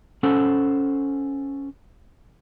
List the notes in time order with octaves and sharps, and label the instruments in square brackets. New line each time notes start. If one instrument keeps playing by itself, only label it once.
[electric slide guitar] C#4 A4 C5 F#5